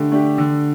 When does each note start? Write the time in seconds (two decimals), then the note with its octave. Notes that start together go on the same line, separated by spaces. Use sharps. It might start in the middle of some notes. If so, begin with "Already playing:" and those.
Already playing: D3 A3 D4 G4
0.11 A3 D4 G4
0.38 D3